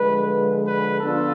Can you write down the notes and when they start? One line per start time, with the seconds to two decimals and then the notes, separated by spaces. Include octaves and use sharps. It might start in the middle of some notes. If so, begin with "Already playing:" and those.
Already playing: D3 F3 G#3 B4
0.68 B4
1.00 D3 F3 B3 D4 F4 A4